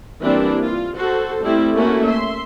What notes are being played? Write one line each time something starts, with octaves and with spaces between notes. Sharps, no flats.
E3 G3 A#3 C4 D4 E4
F4
F#4 A4 C5
G3 A3 C4 E4
A3 A#3 C#4 E4 F#4
E5 C6